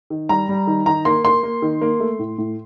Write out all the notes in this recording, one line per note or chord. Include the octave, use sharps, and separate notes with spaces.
D#3
G3 A#5
G3
D#3
D#3 A#5
A#3 C6
A#3 C6
A#3
D#3
A#3
A3
A2
A2